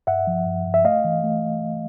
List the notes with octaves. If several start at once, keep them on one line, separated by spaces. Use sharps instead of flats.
G2 E5 F#5
F3
G2
G2
E5
A3 D#5 F5
E3
A3